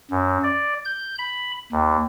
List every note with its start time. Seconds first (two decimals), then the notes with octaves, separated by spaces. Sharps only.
0.11 F#2
0.44 D5
0.85 G6
1.18 B5
1.72 D#2